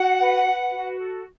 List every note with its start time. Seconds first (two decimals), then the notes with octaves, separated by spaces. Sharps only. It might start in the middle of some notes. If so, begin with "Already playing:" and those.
Already playing: F#4 F#5
0.19 B4
0.46 B4
0.73 F#4
0.98 A4